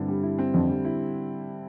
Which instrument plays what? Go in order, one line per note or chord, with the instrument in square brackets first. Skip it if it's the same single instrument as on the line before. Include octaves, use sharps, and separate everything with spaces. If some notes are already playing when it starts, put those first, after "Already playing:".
Already playing: [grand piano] G2 [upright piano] D3 C4 E4
[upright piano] G3
E4
C4
[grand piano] F2 [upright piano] D3
[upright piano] G3
E4